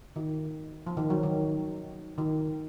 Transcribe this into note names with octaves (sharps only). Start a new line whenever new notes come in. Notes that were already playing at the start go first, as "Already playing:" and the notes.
D#3
F3
D#3
F#3
D#3
D#3